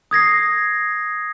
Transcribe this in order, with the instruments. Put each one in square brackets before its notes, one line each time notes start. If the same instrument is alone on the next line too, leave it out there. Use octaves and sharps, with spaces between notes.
[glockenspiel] D#6 G#6 A#6 C7